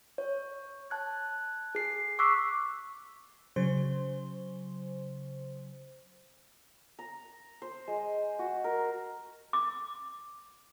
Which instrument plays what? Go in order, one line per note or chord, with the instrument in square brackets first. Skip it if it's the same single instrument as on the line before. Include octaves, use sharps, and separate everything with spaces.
[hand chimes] C#5
A5 F#6 G#6
G#4 C7
C#6 D6 E6 F#6 B6 C7
[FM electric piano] C#3 F#3 C5
[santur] A#5
C5
G#3
F#4
A#4
[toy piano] D6